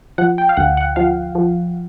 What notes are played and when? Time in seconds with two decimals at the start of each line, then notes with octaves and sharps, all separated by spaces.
0.18 F3 F#5
0.38 G5
0.49 F5
0.57 D2 F#5
0.77 F#5
0.96 F3 F5
1.35 F3